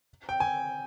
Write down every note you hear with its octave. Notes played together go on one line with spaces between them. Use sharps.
G5
G#5